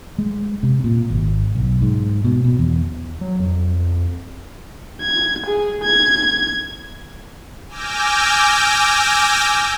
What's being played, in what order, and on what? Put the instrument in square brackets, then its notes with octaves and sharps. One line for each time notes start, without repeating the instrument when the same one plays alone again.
[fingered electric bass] G#3
C3
A#2
G#1
B1
G#2
B2
B2
E2
[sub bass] F#3
F2
[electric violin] G#6
G#4
G#6
[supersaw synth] G#5 D6 E6 F6 G6 A#6